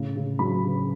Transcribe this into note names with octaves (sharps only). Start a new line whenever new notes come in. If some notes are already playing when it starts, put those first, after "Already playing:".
Already playing: A2 C#3
C#3
F#3 B5
C#3